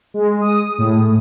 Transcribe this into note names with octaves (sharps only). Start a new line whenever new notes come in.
G#3
D#6
A2